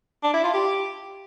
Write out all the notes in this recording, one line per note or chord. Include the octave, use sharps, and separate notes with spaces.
D4
E4
F4
G4